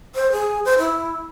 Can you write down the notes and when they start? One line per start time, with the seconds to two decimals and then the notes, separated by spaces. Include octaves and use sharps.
0.15 C5
0.32 G#4
0.65 C5
0.79 E4